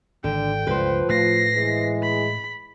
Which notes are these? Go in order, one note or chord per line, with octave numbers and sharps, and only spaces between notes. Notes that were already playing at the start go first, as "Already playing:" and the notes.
G#1 D3 G5
C#2 G2 F3 B4 C5
A2 A3 A#6 C7
E3 G#3
B5